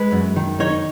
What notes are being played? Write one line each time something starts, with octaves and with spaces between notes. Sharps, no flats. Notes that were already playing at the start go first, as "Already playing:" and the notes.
Already playing: G#3 B4
F#2
D#3
D#4 C#5